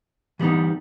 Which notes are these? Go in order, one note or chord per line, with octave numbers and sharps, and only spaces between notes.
E3 G3 B3 D#4